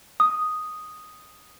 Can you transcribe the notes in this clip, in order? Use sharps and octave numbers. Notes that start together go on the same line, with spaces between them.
D#6